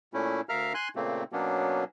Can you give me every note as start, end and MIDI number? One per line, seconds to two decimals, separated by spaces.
0.13 0.41 46
0.13 0.41 57
0.13 0.41 61
0.13 0.41 64
0.49 0.73 38
0.49 0.73 70
0.49 0.73 76
0.49 0.73 77
0.49 0.73 82
0.49 0.73 89
0.74 0.88 80
0.74 0.88 84
0.74 0.88 90
0.96 1.24 46
0.96 1.24 49
0.96 1.24 57
0.96 1.24 58
0.96 1.24 60
1.32 1.84 47
1.32 1.84 54
1.32 1.84 58
1.32 1.84 59
1.32 1.84 61
1.32 1.84 62